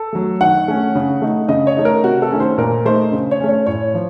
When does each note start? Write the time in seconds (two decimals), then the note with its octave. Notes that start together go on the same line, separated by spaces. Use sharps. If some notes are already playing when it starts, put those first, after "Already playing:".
Already playing: A4
0.13 F#3 A3
0.41 D#3 F#5
0.68 A3 C#4
0.95 C#3
1.22 A3 D#4
1.49 C#3 D#5
1.67 C#5
1.77 A3 D#4
1.85 A#4
2.03 C3 F#4
2.22 A4
2.31 D#3 A3 C#4
2.40 C5
2.58 A#2 A#4
2.85 A3 D#4 C5
3.12 C#3
3.31 C#5
3.40 A3 C#4
3.49 C#5
3.66 A2 C#5
3.94 F3